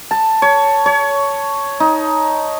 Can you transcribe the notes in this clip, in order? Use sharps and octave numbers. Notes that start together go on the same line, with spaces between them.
A5
C#5
C#5
D#4